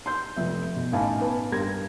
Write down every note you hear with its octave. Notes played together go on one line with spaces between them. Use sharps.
C6 G6
F1 F2 E5
B2
A1 D#4 F5 G#5 A5 B5
B3 B4 A5
G2 G4 A#4 C6 G#6 A#6